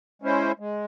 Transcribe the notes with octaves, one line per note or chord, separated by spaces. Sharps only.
G#3 C#4 E4 C5
G#3